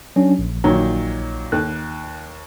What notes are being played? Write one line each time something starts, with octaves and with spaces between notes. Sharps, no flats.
F#3 C#4 D4
A#1
A#2 D#3 F#3
D#2 F#6